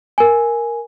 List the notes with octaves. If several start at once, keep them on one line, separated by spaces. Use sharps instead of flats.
A#4 G#5